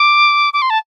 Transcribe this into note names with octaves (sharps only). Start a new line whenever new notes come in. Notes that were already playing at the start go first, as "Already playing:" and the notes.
Already playing: D6
D6
C6
A5